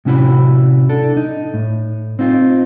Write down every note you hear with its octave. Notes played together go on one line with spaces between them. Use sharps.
A2 C3 C#4 E4 F#4 B5
D4 A4
D#4
A2
C4 D#4 F4